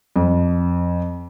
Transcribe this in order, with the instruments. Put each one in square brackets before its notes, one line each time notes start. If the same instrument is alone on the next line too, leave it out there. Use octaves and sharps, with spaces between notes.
[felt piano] F2